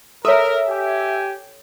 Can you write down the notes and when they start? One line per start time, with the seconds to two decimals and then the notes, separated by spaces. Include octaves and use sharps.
0.25 A4 A#4 C#5 E5
0.68 G4 G#5